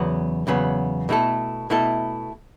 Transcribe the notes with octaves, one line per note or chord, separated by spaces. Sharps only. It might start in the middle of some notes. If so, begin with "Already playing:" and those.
Already playing: E2 C#3 F#3 B3
E2 C#3 F#3 B3
B2 A3 E4 A4
B2 A3 E4 A4